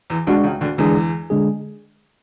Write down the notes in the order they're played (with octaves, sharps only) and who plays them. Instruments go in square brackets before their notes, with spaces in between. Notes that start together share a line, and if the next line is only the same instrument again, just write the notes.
[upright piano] E2 E3
[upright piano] D2 D3 [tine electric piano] G#3 D4 F#4
[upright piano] C#2 C#3
D2 D3
[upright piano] E2 E3 [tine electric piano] D3 G#3 D4 G#4
[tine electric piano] D3 G#3 D4 G#4